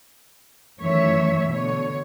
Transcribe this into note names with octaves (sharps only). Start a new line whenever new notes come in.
F#2 D#3 E3 A3 C#5 E5
B2 D3 C#5